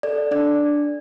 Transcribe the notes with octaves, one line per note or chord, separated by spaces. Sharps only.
A4 D5
D4 D5